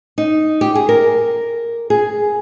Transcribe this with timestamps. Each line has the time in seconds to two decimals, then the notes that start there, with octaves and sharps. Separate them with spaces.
0.18 D#4
0.61 G4
0.75 G#4
0.89 A#4
1.90 G#4